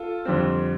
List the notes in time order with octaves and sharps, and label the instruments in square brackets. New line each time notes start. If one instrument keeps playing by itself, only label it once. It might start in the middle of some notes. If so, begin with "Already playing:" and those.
Already playing: [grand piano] F4 A4
F2 D3 G3 C4